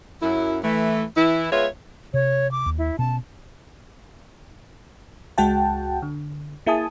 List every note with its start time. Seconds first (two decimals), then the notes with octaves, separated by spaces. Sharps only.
0.22 F#2 E4
0.63 E3 A3
1.17 E3 E4
1.51 G#3 B3 F4 C#5 E5
2.14 C3 C#5
2.51 D6
2.66 D#2
2.78 E4
2.99 B2 C#4 A5
5.38 C#2 G#3 F#4 F#5 G5 A5
6.02 D3
6.66 A#3 E4 G#4 G#5 A5 D#6